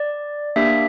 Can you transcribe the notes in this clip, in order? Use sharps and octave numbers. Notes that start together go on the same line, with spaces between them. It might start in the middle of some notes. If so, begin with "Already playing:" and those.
Already playing: D5
A#3 D4 G4 E5